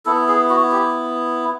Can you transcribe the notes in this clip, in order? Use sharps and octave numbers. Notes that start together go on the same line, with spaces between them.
B3 E4 A4
G#4
F#4
G4